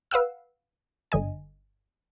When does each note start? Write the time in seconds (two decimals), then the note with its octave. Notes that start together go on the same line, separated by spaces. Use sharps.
0.11 B4 F5 F#5 E6
1.12 G1 D3 D#5 G#5